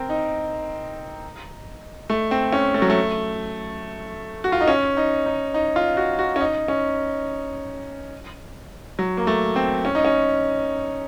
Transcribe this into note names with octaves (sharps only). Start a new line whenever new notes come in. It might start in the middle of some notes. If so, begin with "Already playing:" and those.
Already playing: C4 A#4
D#4
A3
C4
C#4
A3
F#3
A3
F#4
F4
D#4
C#4
D#4
D#4
D#4
F4
F#4
F#4
C#4
D#4
C#4
F#3
A#3
A3
C4
C#4
D#4
C#4